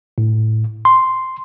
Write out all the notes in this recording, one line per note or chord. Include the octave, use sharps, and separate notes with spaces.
A2
C6